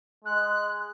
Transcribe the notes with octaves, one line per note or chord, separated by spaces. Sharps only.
G#3 F#6